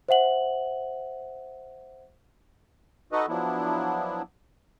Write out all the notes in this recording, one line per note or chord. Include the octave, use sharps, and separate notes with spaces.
C5 E5 F#5 F#7
D#4 F#4 A4 B4 D#5 F#5
F3 F#3 B3 D4 E4